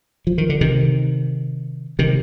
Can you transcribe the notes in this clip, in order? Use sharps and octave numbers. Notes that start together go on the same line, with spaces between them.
F3
D#3
D3
C3 D#3
C3 D#3